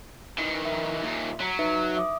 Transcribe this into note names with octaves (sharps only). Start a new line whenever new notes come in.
D#3 E3
E5
D#2 A#2
F#3 A#5 B6
D#4 B4 E5
E5 D6 D#6